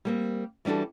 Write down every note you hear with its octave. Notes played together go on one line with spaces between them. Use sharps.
G3 A#3 C4
E3 G3 D4 F#4 A4